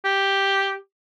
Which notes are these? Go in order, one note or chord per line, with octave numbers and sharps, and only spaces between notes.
G4